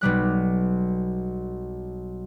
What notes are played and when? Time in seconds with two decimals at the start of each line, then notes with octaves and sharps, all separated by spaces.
0.01 B1 B2 G3 F#6